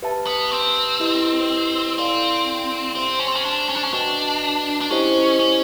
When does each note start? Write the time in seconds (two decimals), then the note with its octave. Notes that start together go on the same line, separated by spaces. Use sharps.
0.02 G4 B4 E5 A5
0.27 B3
0.51 C4
1.00 E4 G4 B4 D#5
1.98 C4 E4 A4 D5 F5 G#5
2.95 C4 G4 C5 E5
3.19 C#4
3.28 C4
3.35 C#4
3.45 D4
3.69 C#4
3.75 D4
3.83 C#4
3.93 D4 F#4 B4 D#5 G5
4.81 D4
4.90 C#4 E4 G4 C5 D#5
5.39 C#4